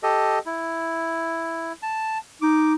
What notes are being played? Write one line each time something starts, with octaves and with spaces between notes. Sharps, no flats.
G4 A4 D#5
E4
A5
D#4 D6